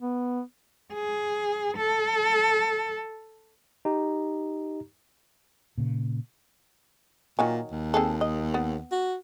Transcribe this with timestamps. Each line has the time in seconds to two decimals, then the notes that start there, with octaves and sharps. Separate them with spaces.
0.01 B3
0.94 G#4
1.77 A4
3.85 D#4 G4 A#5
5.78 A#2 C#3
7.39 A#2 D#3 F#3 G#5
7.72 D#2
7.94 C4 G#4 A4
8.21 D#5
8.54 B3
8.92 F#4